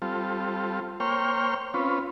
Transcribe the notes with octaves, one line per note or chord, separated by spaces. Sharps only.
G3 C4 F4 A4
A#3 C5 C#5 G5 F6
C4 C#4 F4 B4